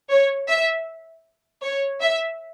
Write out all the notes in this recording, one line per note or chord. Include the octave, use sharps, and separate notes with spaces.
C#5
E5
C#5
E5